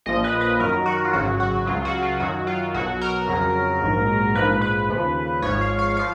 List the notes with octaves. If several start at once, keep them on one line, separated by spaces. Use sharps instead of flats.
A#1 A#2 F3 D#5
B4
B4
F#2 D#3 F#3 A#4
F#4
F4
G#1 F#2 C#3 F#3 F#4
F#4
C#2 C#3 F#3 F4
F#4
F4
F#2 D#3 F#3 F#4
F4
B1 B2 F#3 F#4
A#4
F2 C#3 F#3
A#1 G#2 F#3
A#1 G#2 F3 B4
B4
D#2 C#3 F3
G#1 G#2 F3 C#5
F5
F5
F3 F5